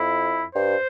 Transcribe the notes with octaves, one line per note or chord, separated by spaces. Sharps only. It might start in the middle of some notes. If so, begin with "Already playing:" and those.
Already playing: F2 E4
G2 C5